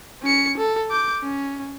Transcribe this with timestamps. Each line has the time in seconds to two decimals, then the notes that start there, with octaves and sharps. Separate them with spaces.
0.23 C#4 C#7
0.57 A4
0.91 D6 G6
1.23 C#4